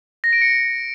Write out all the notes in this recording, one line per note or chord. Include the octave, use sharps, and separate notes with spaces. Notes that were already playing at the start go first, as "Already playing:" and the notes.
A#6
D7
C#7